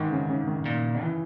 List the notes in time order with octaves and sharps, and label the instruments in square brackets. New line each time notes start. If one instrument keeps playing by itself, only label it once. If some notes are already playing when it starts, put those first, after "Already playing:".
Already playing: [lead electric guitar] G#2 [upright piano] D#3 E3
[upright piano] C#3
C#3
D#3
[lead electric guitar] A#2
E3